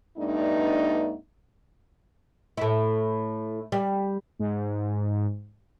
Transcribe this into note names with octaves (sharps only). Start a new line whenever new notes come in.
G2 A3 B3 D4 D#4
A2 E4
G3
G#2